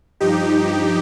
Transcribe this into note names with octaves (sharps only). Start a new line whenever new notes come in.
G2 F3 D#4 G4